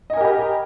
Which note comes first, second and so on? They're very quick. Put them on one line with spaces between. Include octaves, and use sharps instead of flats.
D#5 G#5 A#4 G4 B5